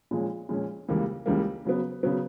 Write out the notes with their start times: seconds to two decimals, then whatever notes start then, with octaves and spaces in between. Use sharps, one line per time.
0.11 A#2 F3 G#3 C#4
0.49 A#2 F3 G#3 C#4
0.88 C#2 C#3 E3 G3 A#3
1.26 C#2 C#3 E3 G3 A#3
1.65 C#3 F#3 B3
2.03 C#3 F#3 B3